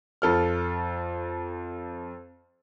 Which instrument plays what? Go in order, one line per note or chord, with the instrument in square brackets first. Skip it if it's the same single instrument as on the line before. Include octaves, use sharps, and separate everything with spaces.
[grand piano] F2 A4 F6